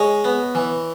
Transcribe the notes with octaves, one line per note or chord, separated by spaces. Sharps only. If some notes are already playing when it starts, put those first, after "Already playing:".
Already playing: G#3 C#5 D#5
B3
E3